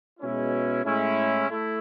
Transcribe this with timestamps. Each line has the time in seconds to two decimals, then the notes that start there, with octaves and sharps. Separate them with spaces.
0.19 B2 G#3 C#4 E4
0.84 A2 G#3 C#4 E4
1.49 A3 E4